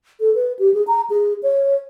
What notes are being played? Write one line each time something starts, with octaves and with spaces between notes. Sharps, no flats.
A4
B4
G4
G#4
A#5
G#4
C#5